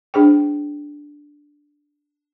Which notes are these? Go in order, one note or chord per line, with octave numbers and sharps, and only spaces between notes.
D4 G#4 C5 G5